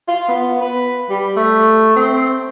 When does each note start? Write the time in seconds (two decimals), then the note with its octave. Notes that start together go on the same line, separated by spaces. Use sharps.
0.08 F4
0.28 B3
0.61 B4
1.10 G3
1.37 A3
1.96 C4